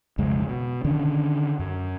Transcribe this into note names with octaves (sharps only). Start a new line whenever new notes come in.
B1 F2 C#3 G#3
B2
D3 D#3 C#4 D4
F#2